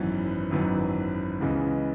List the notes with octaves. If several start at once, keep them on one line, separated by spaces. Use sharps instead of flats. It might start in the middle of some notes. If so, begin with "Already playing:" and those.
Already playing: G#1 F#2 E3 B3
G#1 F#2 E3 B3
C#2 C#3 E3 G#3 B3